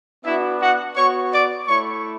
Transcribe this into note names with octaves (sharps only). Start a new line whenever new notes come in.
B3 D4 E4 F#4 E5
F#4 F#5
B3 F#4 C#5 C#6
D5 D6
A3 E4 C#5 C#6